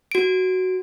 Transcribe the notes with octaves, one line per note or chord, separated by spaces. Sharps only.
F#4 D7